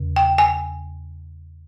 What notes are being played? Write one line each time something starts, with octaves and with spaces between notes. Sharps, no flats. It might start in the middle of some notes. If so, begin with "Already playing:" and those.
Already playing: E2 C#3
G5
G#5